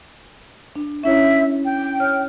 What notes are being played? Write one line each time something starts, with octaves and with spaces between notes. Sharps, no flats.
D4
C#4 E4 C#5 E5
G5
C#5 F6